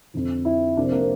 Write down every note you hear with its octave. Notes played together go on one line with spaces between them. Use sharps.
F2 D3 F3
E4
C2 C3 F3 D4
C4
A#3
C4